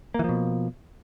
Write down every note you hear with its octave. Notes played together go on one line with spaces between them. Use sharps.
B2 E3 F3 A#3